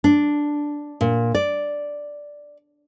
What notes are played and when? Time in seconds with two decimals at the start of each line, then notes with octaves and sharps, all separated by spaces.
0.04 D4
1.01 A#2
1.35 D5